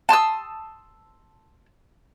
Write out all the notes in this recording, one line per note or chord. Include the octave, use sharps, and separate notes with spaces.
A5 C6 D#6 E6